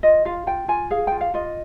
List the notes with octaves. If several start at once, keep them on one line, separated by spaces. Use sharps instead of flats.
F4 D#5
F4 F5
F4 G5
F4 G#5
G#4 F5
F4 G5
F5
F4 D#5